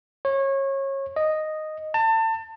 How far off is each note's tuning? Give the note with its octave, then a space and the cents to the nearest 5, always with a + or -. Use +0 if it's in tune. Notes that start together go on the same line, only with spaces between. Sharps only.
C#5 -25
D#5 -5
A5 +30